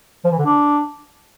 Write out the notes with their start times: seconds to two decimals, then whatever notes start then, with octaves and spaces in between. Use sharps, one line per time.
0.24 F3
0.31 E3
0.38 D3
0.46 D4